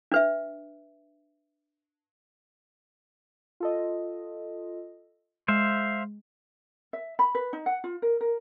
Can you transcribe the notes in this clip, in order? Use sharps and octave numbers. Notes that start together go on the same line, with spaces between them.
D4 B4 E5
F4 A4 D#5
G#3 C5 E5 F5
E5
B5
B4
D#4
F#5
F4
A#4
A#4